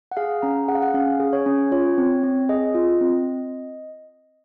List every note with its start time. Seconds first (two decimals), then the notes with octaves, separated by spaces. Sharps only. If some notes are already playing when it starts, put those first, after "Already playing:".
0.12 F#5
0.17 G#4 F5
0.42 C#4 A#5
0.68 G#4 F#5
0.75 F5
0.82 F#5
0.94 C#4 F5
1.20 G#4
1.33 C#5
1.46 C#4
1.72 F4 C#5
1.98 C4
2.23 C4
2.49 G#4 D#5
2.75 F4
3.01 C4